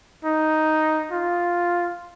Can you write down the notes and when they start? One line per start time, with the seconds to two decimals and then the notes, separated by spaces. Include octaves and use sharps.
0.24 D#4
1.11 F4